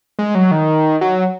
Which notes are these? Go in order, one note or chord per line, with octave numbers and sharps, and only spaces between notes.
G#3
F#3
D#3
F#3